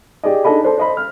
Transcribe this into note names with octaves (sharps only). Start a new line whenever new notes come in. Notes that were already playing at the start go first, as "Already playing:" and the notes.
G4 G#4 D5 D#5
D4 D#4 G#4 A4 D#5 B5
A4 C5 D5
C5 D#5 B5
F6